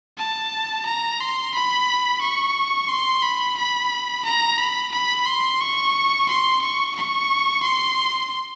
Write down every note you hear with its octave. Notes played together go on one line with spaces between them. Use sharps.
A5
A#5
C6
B5
C#6
C6
B5
B5
A#5
B5
B5
C6
C#6
C6
C#6
C#6
C6